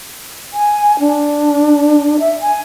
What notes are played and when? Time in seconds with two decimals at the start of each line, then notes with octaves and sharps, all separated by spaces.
0.53 G#5
0.99 D4
2.20 E5
2.41 G#5